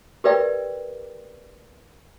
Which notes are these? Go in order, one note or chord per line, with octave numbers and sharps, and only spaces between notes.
G4 A#4 B4 D5 E5 G5